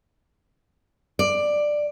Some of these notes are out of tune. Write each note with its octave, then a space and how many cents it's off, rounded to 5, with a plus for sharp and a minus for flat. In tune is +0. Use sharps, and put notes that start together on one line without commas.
D5 +10